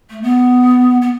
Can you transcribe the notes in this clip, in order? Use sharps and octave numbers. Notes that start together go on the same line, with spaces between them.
A3
B3
B3